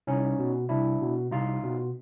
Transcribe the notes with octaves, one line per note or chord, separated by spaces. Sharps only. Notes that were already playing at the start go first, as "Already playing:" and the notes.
C2 C#4 D#4
B2
C2 D4 E4
B2
C2 D#4 F4
B2